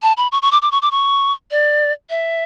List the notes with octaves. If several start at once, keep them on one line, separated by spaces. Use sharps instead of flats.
A5
B5
C#6
C#6
D6
D6
C#6
D6
C#6
D5
E5